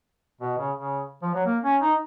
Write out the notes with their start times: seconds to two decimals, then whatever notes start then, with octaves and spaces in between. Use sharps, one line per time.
0.41 B2
0.58 C#3
0.76 C#3
1.23 F3
1.34 F#3
1.46 A#3
1.63 C#4
1.81 D#4